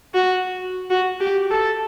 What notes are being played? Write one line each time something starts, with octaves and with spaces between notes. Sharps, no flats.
F#4
F#4
G4
A4